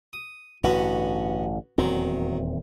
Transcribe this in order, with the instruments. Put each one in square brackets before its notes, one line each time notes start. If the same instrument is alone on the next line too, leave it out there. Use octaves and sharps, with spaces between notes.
[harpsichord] D#6
[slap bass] A1 G2 D3 [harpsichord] B3 C#4 F#4
[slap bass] D#1 E2 C4 [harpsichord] D#3 F#3